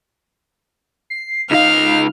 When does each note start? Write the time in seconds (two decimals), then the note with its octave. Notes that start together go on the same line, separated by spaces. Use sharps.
1.10 C7
1.51 C#2 D#4 F5 F6